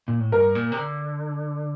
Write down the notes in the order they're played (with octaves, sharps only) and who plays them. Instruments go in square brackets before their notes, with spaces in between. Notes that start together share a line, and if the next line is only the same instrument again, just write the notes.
[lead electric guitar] A#2
A2
[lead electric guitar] G2 [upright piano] A#4
[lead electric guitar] A#2
C3
D3